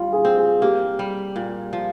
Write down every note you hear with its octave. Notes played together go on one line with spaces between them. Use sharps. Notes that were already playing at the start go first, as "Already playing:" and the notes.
Already playing: G3 F4
G#4
C4
G#4
A#3 G4
G3
A#2
F3